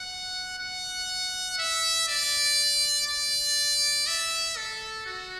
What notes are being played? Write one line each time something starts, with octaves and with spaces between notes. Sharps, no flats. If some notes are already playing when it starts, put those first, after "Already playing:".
Already playing: F#5
F#5
E5
D5
D5
E5
A4
F#4